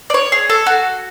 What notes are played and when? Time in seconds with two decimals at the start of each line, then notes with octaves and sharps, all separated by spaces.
0.10 D5
0.14 C#5
0.32 G#4
0.50 A4
0.66 F#4